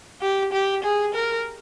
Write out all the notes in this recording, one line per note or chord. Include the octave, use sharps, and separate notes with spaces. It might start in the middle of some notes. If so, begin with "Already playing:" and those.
G4
G4
G#4
A#4